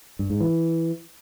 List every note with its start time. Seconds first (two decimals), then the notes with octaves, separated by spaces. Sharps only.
0.19 G2
0.30 G#2
0.40 E3